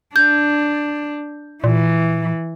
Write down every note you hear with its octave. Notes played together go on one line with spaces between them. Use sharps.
D4 G6
A#2 E3